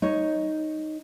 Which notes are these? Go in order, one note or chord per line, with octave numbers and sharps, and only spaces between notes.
D#4 C#5